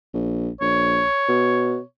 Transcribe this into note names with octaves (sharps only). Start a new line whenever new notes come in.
A#1
A#1 C#5
B2